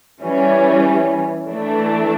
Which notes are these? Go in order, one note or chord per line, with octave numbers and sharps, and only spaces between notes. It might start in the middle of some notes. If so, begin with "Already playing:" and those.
E3 G3 C#4
E3 A3 D4